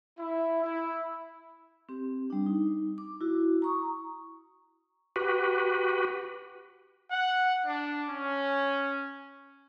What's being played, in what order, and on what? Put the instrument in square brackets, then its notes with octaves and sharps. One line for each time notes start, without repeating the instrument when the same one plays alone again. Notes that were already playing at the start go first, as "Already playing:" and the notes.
[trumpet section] E4
E4
[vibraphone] C4 G4
G3 D4
D#4
D6
E4 F#4
A#5 C#6 D#6
[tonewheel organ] F#4 G4 B4
[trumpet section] F#5
D4
C#4